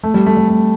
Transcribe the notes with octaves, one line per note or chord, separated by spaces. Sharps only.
A3
G3
A3
G3
A3